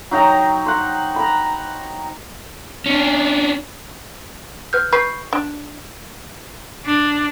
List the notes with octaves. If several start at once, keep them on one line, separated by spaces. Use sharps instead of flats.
F#3 D#4 G5 A#5
C5 F#5
A#5 B5
C#4 D4
B4 F6 G6
B4 C#6 G6 C7
D4
D4